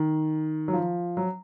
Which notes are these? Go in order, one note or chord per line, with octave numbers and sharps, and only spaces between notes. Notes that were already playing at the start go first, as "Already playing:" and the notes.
Already playing: D#3
F#3
F3
F#3